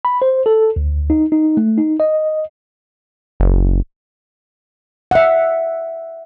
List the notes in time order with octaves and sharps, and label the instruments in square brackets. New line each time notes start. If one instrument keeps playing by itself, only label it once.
[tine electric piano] B5
C5
A4
D2
D#4
D#4
A3
D#4
D#5
[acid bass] F#1
[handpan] E5 F#5